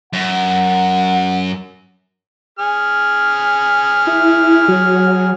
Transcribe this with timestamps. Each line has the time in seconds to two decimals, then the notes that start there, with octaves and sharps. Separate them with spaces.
0.13 F#2 F#5
2.59 G#4 F6
4.07 E4
4.68 F#3